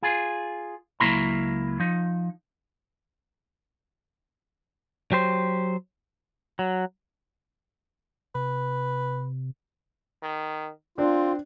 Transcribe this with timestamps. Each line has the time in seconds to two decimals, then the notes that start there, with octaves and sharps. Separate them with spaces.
0.03 F4 G#4
1.00 C#2 F#3 A#3 E4 A#5
1.80 F3 D#4
5.12 F#3 G4 C5
6.59 F#3
8.35 C3 B4
10.23 D#3
10.98 C4 D4 F4